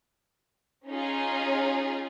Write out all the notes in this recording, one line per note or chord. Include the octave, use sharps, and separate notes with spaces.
C#4 D#4 F4 G#4